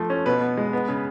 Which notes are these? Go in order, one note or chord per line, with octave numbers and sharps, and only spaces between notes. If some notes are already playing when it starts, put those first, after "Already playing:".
Already playing: F3 A3
C#4
B2 B4
B3
G#3
B3
C#3